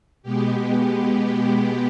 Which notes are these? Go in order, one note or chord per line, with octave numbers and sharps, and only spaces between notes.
B2 G#3 B3 G4
G4